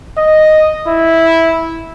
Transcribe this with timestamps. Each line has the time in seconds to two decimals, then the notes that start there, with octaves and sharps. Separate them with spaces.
0.17 D#5
0.88 E4